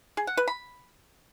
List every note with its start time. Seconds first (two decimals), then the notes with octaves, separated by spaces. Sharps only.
0.17 G#4
0.27 F#5
0.37 B4
0.48 B5